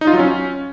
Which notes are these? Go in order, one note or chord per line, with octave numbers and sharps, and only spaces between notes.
D#4
F4
F#3
C#4